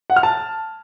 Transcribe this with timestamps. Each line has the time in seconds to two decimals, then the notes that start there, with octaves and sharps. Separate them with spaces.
0.10 F#5
0.16 F6
0.23 A5